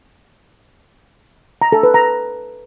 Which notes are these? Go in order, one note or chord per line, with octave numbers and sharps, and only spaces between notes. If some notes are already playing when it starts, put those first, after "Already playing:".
A#5
A4
B4
A#5